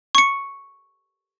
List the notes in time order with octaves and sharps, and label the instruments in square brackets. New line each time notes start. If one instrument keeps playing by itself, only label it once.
[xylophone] C#6 C#7